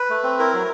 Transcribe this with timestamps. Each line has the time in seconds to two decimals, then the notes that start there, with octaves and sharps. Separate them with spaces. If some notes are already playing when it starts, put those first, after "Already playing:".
Already playing: B4
0.10 A3
0.23 C4
0.39 E4 A#4
0.53 F#3